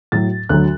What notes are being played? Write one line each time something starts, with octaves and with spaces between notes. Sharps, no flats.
A2 F#3 A6
D2 D3 F#3 F#6